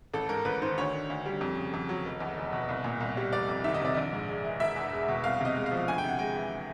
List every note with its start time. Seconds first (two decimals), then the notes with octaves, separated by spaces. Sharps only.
0.13 A1 A4
0.29 G#2 A#4
0.45 A1 B4
0.61 D#3 C5
0.77 D2 C#5
0.94 D3
1.10 D2
1.26 G3
1.41 F2
1.57 C#3
1.74 F2
1.89 F#3
2.05 F1
2.20 E2
2.37 F1
2.53 B2
2.69 C2
2.84 A#2
3.01 C2
3.17 G3
3.33 F1 D5
3.48 F2
3.64 D#3 E5
3.74 D#5
3.80 C3 D5
3.94 A#1 D#5
4.12 G#2
4.29 G#3
4.45 E3
4.60 E1 E5
4.76 E2
4.93 G#3
5.09 B2
5.24 C2 F5
5.41 C3 D#5
5.56 G#3
5.66 F5
5.72 F3
5.88 D2 G#5
5.98 G5
6.04 C3 F#5
6.19 G#3 G5
6.35 E3